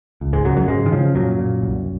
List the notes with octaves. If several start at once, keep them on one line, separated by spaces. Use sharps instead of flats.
C#2
G#2 G#3
F#2 C#3 F#3
F#2 F#3
G#2 C#3 G#3
D#3
C#3 F3
F#2 A#2 F#3
A#2
C2